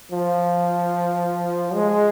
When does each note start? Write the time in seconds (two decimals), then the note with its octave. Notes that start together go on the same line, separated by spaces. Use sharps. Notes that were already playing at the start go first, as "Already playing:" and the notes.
0.12 F3
1.75 G#3